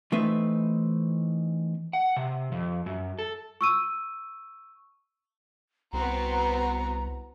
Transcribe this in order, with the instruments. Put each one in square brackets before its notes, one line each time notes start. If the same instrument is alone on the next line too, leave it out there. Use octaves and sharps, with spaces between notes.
[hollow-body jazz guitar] E3 A3 C4 D#4 B4 E5
[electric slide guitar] F#5
C3
F2
F#2
A4
[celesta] C#6 E6 D#7
[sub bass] C2 [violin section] B3 C4 F#4 [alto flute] A#5